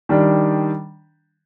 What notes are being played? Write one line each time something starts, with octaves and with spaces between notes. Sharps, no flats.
D#3 G3 D4